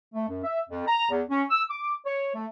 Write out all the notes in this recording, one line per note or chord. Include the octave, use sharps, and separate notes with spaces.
A3
F#2
E5
F2
A#5
E2
C#4
E6
D6
C#5
A3